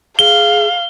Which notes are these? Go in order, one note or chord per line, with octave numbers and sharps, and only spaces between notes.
G#4 F5 G7